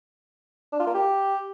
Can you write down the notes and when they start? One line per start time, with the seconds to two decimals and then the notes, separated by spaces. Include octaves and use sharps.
0.73 D4
0.80 F4
0.87 A#3
0.95 G4